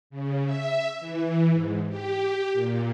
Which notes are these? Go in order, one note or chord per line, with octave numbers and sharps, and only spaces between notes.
C#3
E5
E3
G#2
G4
A#2